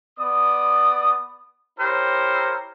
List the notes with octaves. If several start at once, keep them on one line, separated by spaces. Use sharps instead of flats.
B3 D5 D#6
E4 G4 A#4 C5 C#5